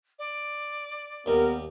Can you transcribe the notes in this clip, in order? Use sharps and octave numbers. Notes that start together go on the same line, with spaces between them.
D5
D#2 G3 B3 A#4